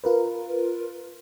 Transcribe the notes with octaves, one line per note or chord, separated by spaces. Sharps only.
F4 A#4 B4